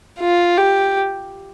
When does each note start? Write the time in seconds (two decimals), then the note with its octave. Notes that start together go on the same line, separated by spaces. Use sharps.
0.20 F4
0.58 G4